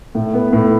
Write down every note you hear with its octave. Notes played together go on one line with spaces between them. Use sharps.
A2
B3
A2